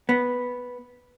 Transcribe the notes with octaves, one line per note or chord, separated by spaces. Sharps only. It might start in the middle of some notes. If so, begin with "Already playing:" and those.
B3